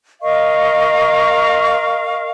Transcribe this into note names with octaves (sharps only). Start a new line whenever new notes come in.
A#4 D#5 F5 C#6